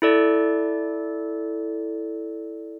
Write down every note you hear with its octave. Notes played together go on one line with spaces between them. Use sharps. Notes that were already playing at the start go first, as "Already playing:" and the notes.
E4 A4 D5